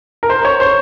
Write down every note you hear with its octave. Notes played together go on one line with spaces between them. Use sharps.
A#4
C5
C#5
C5